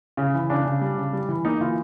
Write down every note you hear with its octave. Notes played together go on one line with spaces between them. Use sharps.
C#3
E3
C#3 D4
C#3
G3
C#3
G3
E3
A#3 D#4
E3 F4